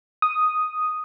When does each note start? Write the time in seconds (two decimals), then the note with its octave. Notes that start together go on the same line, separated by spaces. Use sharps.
0.22 D#6